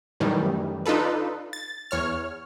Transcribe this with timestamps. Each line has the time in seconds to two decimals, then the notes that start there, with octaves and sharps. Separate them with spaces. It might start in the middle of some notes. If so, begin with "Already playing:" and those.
0.20 F#2 A2 D#3 E3 G3
0.86 D4 D#4 F4 A4 B4
1.53 A6
1.91 E2 C#5 F6